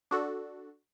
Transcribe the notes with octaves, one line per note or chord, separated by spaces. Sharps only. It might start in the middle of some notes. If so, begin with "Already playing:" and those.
D4 F#4 A4